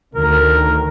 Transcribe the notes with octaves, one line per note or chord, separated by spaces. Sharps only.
D2 D#3 A#4